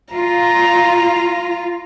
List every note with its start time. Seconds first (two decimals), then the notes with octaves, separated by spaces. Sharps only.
0.14 F4 A#5